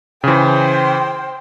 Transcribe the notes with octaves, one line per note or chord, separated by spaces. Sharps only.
C#3 E3 C5 G5